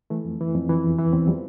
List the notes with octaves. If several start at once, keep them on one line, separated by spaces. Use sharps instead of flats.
E3 A3
F2
E3
F2
E3
E2
E3 E4
E2 C4
F3 G3